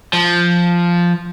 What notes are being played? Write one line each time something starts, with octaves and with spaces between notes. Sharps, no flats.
F3